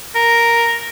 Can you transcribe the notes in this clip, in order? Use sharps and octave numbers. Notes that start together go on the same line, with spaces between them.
A#4